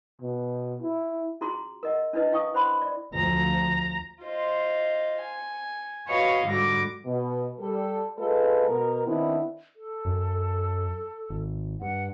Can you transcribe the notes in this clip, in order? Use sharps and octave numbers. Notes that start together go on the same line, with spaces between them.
B2
E4
C#4 F4 F#4 G#4 A#5 C6
A#4 D#5 F#5
C#4 D4 E4 B4 D#5
E4 F5 G5 C#6 D#6
C5 F#5 B5 C6
D5
D2 F3 A#5
F4 C5 D#5
G#5
F#4 B4 C#5 D#5 F5
G#2 D3 G3 F#4 D6 A#6
B2
G3 A4
G#3 F4 A4 B4
B2 A#4
D#3 B3 C4 D4 E4
A4
F#2
G#1
G2 F#5